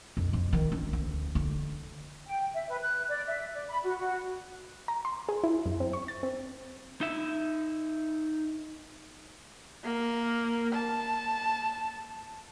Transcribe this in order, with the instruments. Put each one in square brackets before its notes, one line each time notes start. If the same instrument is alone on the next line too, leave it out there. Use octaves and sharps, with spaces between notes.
[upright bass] F2
F2
D#3
C#4
D2
D3
[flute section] G5
E5
B4
F#6
D5
E5
D5
B5
F#4
F#4
[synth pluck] A#5
C6
G#4
E4
F#2
C4
C#6
A6
C4
[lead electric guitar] D#4 E5
[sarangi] A#3
A5